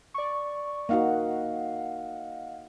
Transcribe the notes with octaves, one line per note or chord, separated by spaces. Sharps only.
D5 C#6
A#3 D#4 F#4 D#5 F5 F#5